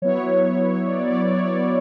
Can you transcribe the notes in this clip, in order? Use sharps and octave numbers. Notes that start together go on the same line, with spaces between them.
F#3 B3 E4 C#5
D5
D5
D5
C#5
D5